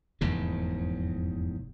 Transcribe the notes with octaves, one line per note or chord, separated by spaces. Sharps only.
F1 E2 G#2 C#3